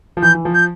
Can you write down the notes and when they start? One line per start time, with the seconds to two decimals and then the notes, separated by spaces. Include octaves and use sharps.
0.17 F3
0.22 E3 G6
0.35 E3
0.45 F3
0.54 G6